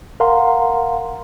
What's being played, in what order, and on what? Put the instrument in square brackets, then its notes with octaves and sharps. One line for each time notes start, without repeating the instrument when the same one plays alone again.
[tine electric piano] A#4 F5 F#5 A#5 C6